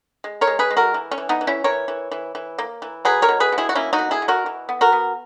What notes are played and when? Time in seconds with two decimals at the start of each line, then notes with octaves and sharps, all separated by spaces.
0.24 G#3
0.41 A#4 C#5
0.47 G#3
0.59 G#4 B4
0.71 G#3
0.77 F#4 A#4
0.94 E3
1.11 C#4
1.18 E3
1.29 B3 D#4
1.41 E3
1.47 C#4 E4
1.64 E3 A#4 C#5
1.88 E3
2.11 E3
2.35 E3
2.58 A#3
2.82 E3
3.05 F#3 G#4 B4
3.22 A#4 C#5
3.29 B2
3.40 G#4 B4
3.52 B2
3.58 E4 G#4
3.69 F#4
3.75 A#3 C#4 E4
3.93 D#4 F#4
3.99 B2
4.11 E4 G#4
4.22 B2
4.28 F#4 A#4
4.46 E3
4.69 B3
4.81 F#4 A#4
4.92 B3